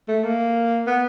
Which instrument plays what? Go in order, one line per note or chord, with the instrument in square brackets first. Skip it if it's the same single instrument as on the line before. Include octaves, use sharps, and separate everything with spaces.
[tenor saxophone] A3
A#3
B3